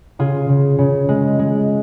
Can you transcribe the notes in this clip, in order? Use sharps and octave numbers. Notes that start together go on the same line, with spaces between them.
C#3 F4 G#4
C#3
C#3
G#3
G#3